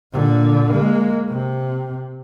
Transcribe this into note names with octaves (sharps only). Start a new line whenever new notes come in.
A#2 D3
G#3 A#3
C3